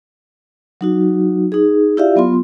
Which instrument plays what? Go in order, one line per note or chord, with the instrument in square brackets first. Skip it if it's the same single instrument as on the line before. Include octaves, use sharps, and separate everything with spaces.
[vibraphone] F#3 D#4 F#4
D#4 G#4
E4 F4 G4 D5 E5 F5
F#3 B3 F4 C6